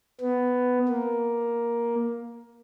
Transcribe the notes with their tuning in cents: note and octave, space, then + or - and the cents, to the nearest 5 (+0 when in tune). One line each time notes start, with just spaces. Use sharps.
B3 +10
A#3 +10